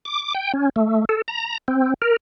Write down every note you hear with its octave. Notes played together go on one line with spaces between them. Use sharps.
D6
G5
C#4
A3
A4
A#5
C4
A#4